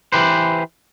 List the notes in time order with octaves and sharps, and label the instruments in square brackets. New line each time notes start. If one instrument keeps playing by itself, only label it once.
[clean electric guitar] E3 G4 B4 C5